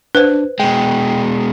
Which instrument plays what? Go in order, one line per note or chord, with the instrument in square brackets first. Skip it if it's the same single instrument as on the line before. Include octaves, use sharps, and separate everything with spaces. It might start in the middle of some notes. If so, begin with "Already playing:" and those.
[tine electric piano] D4 [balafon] B4 C5
[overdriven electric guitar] B2 G#3 [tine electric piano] G5